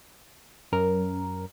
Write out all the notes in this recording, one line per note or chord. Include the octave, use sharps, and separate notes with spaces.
F#2 A#4